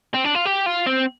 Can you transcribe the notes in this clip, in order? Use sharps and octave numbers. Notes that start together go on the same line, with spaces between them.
C4
D4
F4
G4
F4
C4